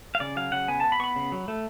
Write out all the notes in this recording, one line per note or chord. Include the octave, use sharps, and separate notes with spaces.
F5
C#3 D5
F#3 F5
C#3 F#5
B3 G#5
B3 A5
B5
B3 B5 C#6
C#3
F#3
A3